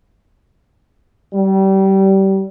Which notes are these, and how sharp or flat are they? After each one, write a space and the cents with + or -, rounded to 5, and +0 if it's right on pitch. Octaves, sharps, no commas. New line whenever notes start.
G3 -25